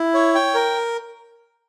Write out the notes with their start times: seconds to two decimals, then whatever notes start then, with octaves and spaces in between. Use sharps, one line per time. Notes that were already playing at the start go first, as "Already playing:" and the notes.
Already playing: E4
0.14 C#5
0.35 G5
0.55 A#4